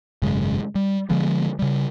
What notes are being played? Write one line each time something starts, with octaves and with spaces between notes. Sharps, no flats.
G#1 F#2 C#3 G#3
G3
D3 F3 G#3 B3
C#3 G3